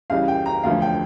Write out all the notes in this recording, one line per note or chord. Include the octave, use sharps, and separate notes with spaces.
C#2 C#3 E3 G3 F5
G5
A#5
E1 D2 D3 F3 F5
G5